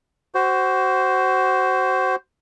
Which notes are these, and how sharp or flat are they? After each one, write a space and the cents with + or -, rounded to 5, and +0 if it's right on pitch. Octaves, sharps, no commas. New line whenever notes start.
F#4 +25 C5 +0